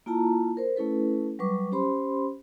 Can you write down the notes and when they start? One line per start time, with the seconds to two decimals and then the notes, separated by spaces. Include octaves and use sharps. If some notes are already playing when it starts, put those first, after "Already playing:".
0.06 A#3 E4 F4 A5 A#5
0.57 A#4 C5
0.76 A3 C#4 E4 A4 B4
1.39 F#3 G3 B4 C#6 D6
1.72 C#4 G4 C5 B5 C6